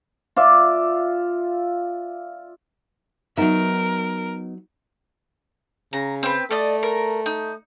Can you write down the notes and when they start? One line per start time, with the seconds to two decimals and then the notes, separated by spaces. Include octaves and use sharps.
0.36 F4 D5 E5
3.37 F#3 B3 D#4 A#4 E5
5.93 C#3 A#5
6.23 C4 B4
6.51 A3 D5 D#5
6.83 A#4
7.26 D#4